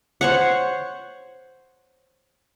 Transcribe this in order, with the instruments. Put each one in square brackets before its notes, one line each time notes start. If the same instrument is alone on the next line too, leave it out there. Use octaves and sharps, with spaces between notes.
[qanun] C5 C#5 F#5